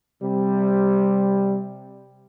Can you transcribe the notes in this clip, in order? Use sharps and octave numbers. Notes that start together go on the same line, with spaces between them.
C3 G3